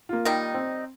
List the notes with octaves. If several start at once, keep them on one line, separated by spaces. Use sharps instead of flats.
A#3 F4
D#3 G3 D#4
C4